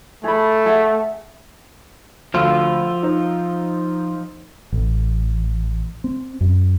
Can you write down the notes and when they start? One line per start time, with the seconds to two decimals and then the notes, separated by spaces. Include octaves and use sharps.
0.24 A3 G#4 B5
0.66 G#4 E5 F#5
2.34 D2 F3 F4 E6
3.03 D#4 C5
4.72 A1
6.04 C4
6.41 F#2